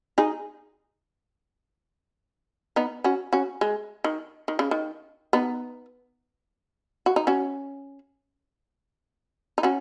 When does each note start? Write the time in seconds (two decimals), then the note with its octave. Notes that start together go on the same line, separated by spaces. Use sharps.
0.18 D#4 G#4
2.76 B3 D#4
3.04 C#4 F#4
3.33 C#4 F#4
3.61 G#3
4.04 D#3
4.48 D#3
4.59 C#3
4.71 D#3
5.33 B3 D#4
7.06 F#4
7.16 D#4
7.27 C#4 F#4
9.58 D#4
9.63 C#4 F#4